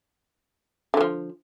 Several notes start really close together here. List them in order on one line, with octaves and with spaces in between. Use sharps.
D3 F#3 F3